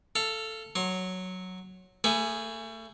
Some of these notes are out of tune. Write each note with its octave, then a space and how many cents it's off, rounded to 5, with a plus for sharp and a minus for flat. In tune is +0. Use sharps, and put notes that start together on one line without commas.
A4 +5 F5 -15
F#3 +0 C6 +40
A3 +30 G#4 +0 B5 +0